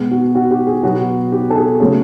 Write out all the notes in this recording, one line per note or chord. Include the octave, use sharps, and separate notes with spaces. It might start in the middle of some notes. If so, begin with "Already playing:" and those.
Already playing: B2 G#3 B3
F#4
F#4
G4
G#4
B2 F#3 B3 F#4
G4
A4
G#4
C#3 F#3 A3 C#4 G#4